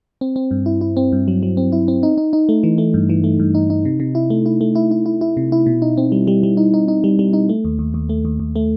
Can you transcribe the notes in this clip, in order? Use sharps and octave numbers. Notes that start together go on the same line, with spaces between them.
C4
C4
G2
E4
E4
C4
G2
F#3
F#3
C4
E4
C4
D#4
D#4
D#4
A3
E3
A3
G2
E3
A3
G2
D#4
D#4
C3
C3
E4
A3
E4
A3
E4
E4
E4
E4
C3
E4
B2
D#4
C4
G3
G3
G3
D#4
D#4
D#4
G3
G3
D#4
A3
D#2
D#2
D#2
A3
D#2
D#2
A3